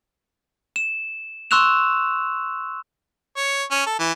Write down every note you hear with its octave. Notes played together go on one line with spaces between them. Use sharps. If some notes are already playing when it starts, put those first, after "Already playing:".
E7
C6 C#6 E6 F#6 E7 F7
C#5
C#4
A4
E3